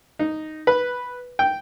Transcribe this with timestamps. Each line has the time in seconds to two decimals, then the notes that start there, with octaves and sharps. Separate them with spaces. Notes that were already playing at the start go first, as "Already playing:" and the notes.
0.19 D#4
0.67 B4
1.39 G5